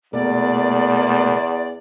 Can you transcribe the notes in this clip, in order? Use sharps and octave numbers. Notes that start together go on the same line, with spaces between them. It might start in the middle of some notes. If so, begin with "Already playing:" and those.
E2 B2 A3 A#3 D5